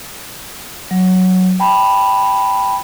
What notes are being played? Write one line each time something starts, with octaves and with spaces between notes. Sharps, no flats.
F#3
G5 A5 B5